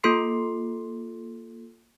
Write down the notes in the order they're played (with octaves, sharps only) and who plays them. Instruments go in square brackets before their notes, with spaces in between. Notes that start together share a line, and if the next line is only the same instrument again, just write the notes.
[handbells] A#3 F4 A4 C6 C7